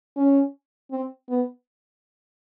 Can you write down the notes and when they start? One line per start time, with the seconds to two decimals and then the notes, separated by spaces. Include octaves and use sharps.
0.17 C#4
0.91 C4
1.29 B3